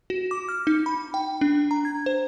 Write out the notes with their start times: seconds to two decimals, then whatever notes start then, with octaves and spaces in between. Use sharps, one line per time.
0.10 F#4
0.31 D6
0.49 F6
0.67 D#4
0.86 B5
1.14 G5
1.41 D4
1.71 A#5
1.85 G#6
2.06 C5